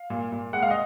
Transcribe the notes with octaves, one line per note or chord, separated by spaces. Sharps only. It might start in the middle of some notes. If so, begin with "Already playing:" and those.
Already playing: F5
A#2
A#2
G#3 F#5
F5
D#5